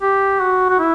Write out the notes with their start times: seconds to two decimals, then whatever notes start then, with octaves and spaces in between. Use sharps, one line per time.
0.01 G4
0.40 F#4
0.70 F#4
0.79 E4